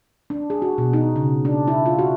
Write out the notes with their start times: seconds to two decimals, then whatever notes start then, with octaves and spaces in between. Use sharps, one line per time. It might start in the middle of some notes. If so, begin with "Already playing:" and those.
0.30 D4
0.50 G#4
0.62 F#4
0.78 B2
0.93 D#4
1.16 C#3
1.45 D4
1.68 E4
1.86 F4
1.99 F#4